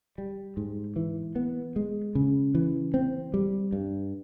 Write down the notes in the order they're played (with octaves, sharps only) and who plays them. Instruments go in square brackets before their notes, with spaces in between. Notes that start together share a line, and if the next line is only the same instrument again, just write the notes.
[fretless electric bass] G3
G#2
E3
B3
G#3
C#3
E3
C4
G3
G2